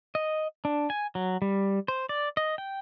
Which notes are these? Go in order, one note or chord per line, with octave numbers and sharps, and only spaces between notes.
D#5
D4
G#5
F#3
G3
C5
D5
D#5
G5